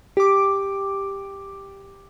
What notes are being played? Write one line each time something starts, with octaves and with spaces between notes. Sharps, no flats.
G4 D6